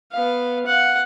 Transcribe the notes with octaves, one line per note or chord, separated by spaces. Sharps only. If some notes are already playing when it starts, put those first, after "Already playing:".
B3 F5
F5 F#5